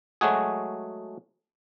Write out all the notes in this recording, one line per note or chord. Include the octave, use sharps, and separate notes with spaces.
F#3 G#3 A3 F#4 G#4